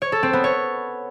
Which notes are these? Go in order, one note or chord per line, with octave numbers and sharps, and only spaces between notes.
C#5
A4
C4
B3
C#5